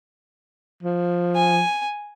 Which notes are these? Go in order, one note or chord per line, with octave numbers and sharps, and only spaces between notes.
F3
G#5